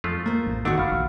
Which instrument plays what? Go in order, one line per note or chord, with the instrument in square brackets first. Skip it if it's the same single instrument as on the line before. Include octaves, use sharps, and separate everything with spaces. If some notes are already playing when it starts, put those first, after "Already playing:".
[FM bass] F2 [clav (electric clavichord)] G#3 A3 F4
[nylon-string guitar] A#3 C5
[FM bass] A1
[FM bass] D#3 [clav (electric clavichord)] G#3 A3 D4 [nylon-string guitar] F#4 F#5 [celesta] E6
[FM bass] F#1 [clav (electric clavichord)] D#3 [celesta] F5 B5 F6
[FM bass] A#1